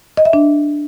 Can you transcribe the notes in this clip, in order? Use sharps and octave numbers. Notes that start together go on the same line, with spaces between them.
D#5
E5
D4